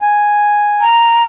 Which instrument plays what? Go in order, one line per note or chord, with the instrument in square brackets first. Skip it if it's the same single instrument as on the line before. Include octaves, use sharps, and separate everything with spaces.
[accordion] G#5
[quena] A#5